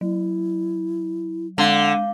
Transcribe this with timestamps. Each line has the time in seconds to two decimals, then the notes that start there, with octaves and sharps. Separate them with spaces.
0.01 F#3 E4
1.58 D3 G#3 F5 G6